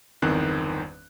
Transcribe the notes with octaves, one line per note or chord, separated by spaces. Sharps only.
G1 E2 D#3 C4 C5 F#6